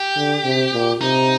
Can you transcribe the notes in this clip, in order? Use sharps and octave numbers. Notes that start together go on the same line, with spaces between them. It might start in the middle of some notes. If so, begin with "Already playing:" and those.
Already playing: G4
D3
C3
A#2
C3 D#4